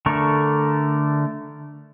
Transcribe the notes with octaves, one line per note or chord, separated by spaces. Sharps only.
D3 A3 A#4 C#6